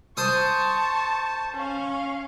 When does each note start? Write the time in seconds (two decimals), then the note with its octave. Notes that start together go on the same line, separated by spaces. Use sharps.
0.17 C5 A5 C#6 D#6
1.53 C#4 F5